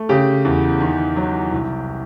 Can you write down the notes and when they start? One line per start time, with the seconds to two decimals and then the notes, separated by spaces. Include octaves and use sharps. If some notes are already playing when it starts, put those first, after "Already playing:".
Already playing: A3
0.09 C#3 G4
0.45 E2
0.80 D#3
1.16 F#3
1.52 C2